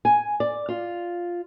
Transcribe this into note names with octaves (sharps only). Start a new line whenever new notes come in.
G#5
D5
F4